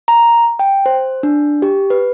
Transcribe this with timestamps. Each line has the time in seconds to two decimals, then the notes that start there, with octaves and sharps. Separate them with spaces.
0.08 A#5
0.59 G5
0.86 C5
1.23 D4
1.62 G4
1.90 B4